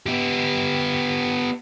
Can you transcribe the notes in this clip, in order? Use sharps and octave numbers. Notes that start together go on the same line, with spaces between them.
B3 G4